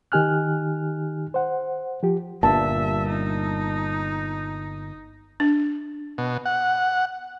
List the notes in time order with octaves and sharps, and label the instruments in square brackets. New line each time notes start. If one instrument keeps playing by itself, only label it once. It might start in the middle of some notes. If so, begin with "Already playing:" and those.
[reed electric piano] D#3 D#4 G4 G#5 F6 F#6
C5 F#5
F3 G4
[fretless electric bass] G1 G2 A#2 [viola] E5 [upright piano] A5
[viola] D#4
[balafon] D4
[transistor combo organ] B2
F#5